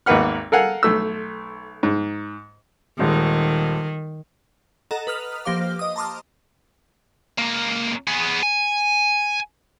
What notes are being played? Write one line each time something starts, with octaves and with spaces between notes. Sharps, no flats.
G#1 D#2 A#3 B4 F#5 F6
A4 A#4 F5 F#5 G#5
B1 A3 E6
G#2
D#1 D#3 G#3
A4 D#5 F#5 A#5
B4 D#6 F6 F7
F3 A#3 G4 C5 F5 D6
D#5 D#6
A5 A#5 C6 D6 D#6 F6
C#2 A#3
B3 G#4
G#5